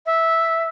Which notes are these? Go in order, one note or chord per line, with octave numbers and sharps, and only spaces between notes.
E5